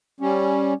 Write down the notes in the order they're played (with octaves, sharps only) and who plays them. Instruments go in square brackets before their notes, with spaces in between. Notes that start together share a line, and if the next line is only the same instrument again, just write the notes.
[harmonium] G3 C#4